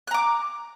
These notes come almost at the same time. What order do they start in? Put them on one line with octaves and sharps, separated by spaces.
F#6 A#5 D6